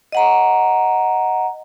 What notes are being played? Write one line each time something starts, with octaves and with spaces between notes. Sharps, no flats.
D#5 F#5 A#5